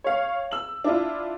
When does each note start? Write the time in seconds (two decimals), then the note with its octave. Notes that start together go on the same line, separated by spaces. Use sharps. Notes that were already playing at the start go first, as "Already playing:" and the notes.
0.04 C#5 F5
0.51 E6 F#7
0.84 D4 E4 F4